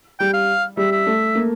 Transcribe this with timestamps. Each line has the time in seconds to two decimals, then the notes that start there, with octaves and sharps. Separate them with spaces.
0.19 G3 G5
0.33 F5
0.77 G3 E5
0.92 E5
1.06 A3
1.35 A#3